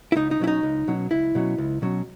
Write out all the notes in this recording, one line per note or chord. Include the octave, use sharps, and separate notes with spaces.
E4
C#2 D#4
D#4
B2 F#3 C#4 E4
D#4
C#2
B2 F#3 C#4
C#2 E4
B2 F#3 C#4
C#2
B2 F#3 C#4